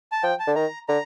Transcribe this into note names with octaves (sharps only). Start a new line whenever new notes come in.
A5
F3 G5
A5
D3
D#3 A#5
D3 A#5